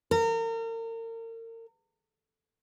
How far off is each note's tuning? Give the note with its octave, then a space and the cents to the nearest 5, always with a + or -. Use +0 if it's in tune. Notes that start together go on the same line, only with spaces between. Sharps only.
A#4 -35